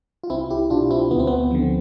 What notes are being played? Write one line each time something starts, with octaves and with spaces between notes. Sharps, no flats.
F4
C2 C4 E4
E4 G4
B2 D4 F4
C4 E4
D2 B3
C4
B3
D3 F3